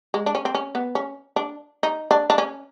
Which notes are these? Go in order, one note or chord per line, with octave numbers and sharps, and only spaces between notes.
G#3
D4
C#4
C4
C#4
B3
C#4
D4
D#4
D4
D4
C#4